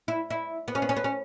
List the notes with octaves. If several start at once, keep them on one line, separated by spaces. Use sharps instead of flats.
E4
E4
B3
C#4
B3
C#4
B3
C#4